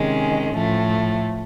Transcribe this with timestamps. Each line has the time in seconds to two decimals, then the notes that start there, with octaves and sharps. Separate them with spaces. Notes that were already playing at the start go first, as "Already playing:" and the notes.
Already playing: C3 D#3 G#3 C#4
0.54 A2 F3 A3